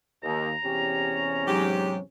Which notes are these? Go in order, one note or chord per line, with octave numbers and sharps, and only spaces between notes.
D#2 A#5
E2 C3 C#4 G4
G#2 F#3 G4